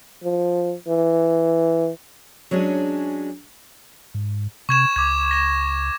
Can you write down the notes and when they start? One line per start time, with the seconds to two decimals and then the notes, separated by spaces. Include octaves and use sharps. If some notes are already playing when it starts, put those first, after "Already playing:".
0.24 F3
0.88 E3
2.51 F#3 G#3 C#4 D4
4.15 G#2
4.69 C3 C#6 G#6 E7
4.96 C#2 D6 G#6
5.31 A#6 E7